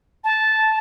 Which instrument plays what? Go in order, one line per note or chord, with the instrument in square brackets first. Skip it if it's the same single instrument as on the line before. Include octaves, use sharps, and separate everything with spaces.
[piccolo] A5